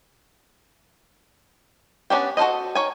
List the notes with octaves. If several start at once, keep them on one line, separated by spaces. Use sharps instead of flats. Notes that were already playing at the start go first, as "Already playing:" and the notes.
B3 C#4 D4 G4
F#4 A4 A#4 C5 D#5
D#3 C#5 G#5